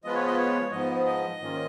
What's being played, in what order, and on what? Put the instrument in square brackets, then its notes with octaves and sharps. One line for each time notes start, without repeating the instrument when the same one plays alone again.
[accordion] F3 G#3 B3 F4 B4 [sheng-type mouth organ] D#5
[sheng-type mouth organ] C#5
D#5
C#5
[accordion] G#2 F3 B3 [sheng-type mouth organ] D#5
[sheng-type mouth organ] D#5
[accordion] G#2 D#3 A#3 C#4 F4